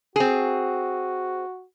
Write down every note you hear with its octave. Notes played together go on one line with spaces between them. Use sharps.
C4 F#4 G#4